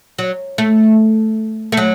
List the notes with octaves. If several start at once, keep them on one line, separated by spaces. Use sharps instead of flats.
F#3
A3
A3
F#3